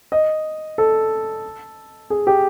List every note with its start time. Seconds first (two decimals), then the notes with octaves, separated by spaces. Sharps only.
0.12 D#5
0.78 A4
2.10 G#4
2.27 G4